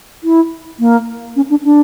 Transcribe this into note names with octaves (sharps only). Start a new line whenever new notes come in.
E4
A#3
C#4
D4
D4